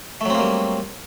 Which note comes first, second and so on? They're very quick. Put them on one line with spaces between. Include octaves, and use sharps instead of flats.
A3 F#3 C4 A#3 G3